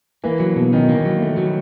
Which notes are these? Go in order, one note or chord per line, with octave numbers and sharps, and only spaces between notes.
E3 A#3
F#3
B2
D#3 C#4
A#3
F#3
A3
F#3